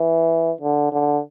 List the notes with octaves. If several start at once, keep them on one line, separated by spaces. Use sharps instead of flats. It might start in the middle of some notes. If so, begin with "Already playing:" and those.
Already playing: E3
D3
D3